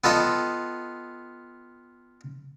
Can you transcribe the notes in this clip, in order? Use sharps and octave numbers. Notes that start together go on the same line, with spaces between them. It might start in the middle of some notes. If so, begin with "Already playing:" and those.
B3 F4 A4 D#5 G5